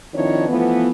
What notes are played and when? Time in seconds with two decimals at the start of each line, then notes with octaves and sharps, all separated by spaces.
0.14 D#3 F3 C4 D4 E4 C#5
0.48 E3 F3 A3 B3